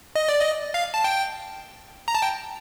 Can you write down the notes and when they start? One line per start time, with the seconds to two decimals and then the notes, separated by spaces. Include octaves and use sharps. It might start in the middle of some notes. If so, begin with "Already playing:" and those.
0.16 D#5
0.29 D5
0.41 D#5
0.74 F5
0.94 A5
1.04 G5
2.08 A#5
2.15 A5
2.22 G5